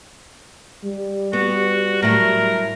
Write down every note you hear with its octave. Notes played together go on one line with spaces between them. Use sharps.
G3
B3 F#4
A2 F#3 A#4